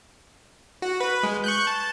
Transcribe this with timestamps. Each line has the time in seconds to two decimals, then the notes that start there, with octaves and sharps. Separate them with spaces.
0.82 F#4
1.00 B4
1.23 G#3
1.44 C#6 F#6 G6
1.67 A5